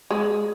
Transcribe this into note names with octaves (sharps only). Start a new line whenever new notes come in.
G#3